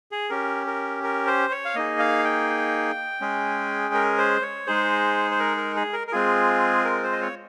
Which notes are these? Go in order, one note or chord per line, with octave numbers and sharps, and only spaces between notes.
G#4
C#4 G4 A#4
A#4
A#4
C5
C#5
F5
A#3 D#4 G#4 D#5
F5
G5
G#3 C#4 G#4
A#4
C5
C#5
G#3 D#4 G#4 C5
C5
A#4
A#4
G#4
A#4
A#4
G#3 C4 F4 G#4
A#4
C5
D#5
C#5